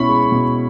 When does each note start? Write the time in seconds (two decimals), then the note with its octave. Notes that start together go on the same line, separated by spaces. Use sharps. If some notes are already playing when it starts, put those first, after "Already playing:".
Already playing: B2 C#4 E4 B5 C#6
0.09 G#3
0.32 B2